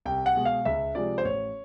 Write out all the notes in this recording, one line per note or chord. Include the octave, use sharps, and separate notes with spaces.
C2 G5
F#5
B2 G#3
F5
C#2 E5
C3 F3 G#3 D5
C5
A1 C#5